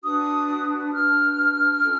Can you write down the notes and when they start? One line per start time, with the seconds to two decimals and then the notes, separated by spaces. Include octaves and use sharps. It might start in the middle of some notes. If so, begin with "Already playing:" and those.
0.03 D4 F#4 B4 D#6
0.93 D4 F#4 B4 F6
1.82 C#4 F4 A4